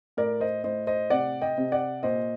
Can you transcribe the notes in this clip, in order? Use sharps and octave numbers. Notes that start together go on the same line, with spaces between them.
A2 A#4 D5
C5 D#5
A2 C5 D#5
C5 D#5
C3 D5 F#5
D#5 G5
C3
D5 F#5
A#2 C5 D#5